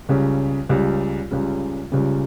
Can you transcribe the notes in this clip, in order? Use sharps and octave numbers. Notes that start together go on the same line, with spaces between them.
C#2 C#3 G3
C#2 C#3 G3
C#2 C#3 G3
C#2 C#3 G3